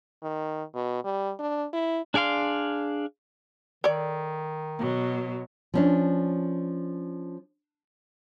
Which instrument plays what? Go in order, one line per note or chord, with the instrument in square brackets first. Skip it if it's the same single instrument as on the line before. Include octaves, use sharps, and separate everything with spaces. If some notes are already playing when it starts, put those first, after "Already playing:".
[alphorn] D#3
B2
G3
D4
E4
[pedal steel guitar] D4 G#4 D5 F5 C6
[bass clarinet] D#3 [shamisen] A4 C#5 D5
[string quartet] B2 F#3
[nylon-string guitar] F3 C#4 D4